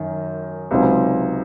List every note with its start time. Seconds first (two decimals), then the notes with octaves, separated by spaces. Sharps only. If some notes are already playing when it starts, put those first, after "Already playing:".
Already playing: F#2 D#3
0.71 C#2 C3 F#3 C4 D#4